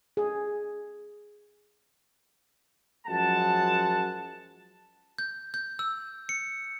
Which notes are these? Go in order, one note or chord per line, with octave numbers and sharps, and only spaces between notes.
G#4
F#2 F3 G#3 F#5 A5
G6
G6
E6
C#7